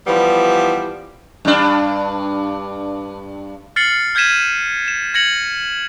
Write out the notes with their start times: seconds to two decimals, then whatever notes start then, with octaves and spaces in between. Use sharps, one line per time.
0.07 E3 F3 G3 B3
1.45 G2 D4
3.76 F6 A6 C7 C#7 F#7
4.15 F6 G6 G#6 B6 D#7 E7
4.88 E7
5.14 G#6 A#6 C#7 F#7